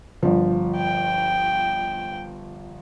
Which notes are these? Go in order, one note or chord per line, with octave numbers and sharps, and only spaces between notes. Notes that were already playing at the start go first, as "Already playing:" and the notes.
G1 F3
G5